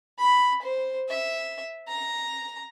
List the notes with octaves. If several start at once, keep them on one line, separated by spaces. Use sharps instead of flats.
B5
C5
E5
A#5